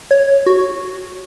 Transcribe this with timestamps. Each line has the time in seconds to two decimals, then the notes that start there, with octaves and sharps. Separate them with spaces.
0.11 C#5
0.46 F#4